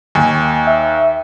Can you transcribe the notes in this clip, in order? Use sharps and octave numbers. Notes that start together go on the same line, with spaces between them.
D#2 G#5
E5